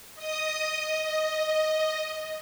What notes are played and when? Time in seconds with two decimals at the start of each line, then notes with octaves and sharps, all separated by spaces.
0.15 D#5 D#6
0.75 D#5